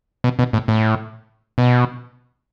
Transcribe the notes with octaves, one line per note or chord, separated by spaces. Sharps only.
B2
B2
A2
A2
B2